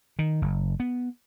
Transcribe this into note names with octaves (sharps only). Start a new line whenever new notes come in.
D#3
F#1
B3